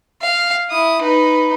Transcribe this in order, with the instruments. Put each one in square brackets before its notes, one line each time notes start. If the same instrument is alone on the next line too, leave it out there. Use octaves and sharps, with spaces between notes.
[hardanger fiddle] F5
E4 D#6
D#4 B4